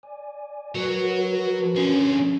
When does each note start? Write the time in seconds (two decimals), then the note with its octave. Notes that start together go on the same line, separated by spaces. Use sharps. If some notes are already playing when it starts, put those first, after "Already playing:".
0.03 D5 G#5
0.75 F#3 F#4 A#4 B4 C#5
1.75 D3 C#4 G#4